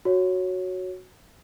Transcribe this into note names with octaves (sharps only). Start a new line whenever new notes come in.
F#4 C#5